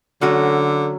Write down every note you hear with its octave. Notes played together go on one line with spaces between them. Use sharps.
D3 F#3 A3 C#4 F#4